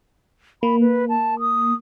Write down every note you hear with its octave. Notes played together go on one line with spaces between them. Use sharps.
A#3 B5
B4
A5
D#6